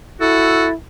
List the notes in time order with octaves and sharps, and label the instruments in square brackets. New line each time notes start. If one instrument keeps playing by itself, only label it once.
[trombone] E4 [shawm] F#4 [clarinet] A4